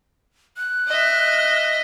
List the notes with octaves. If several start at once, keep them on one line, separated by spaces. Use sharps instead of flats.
F#6
D#5 E5